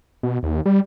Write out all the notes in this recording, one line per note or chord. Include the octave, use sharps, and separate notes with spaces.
B2
D#2
G3